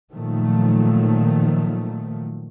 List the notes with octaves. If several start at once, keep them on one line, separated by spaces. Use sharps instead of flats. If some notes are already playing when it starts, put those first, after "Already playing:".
A#2 D#3 F3 F#3 A3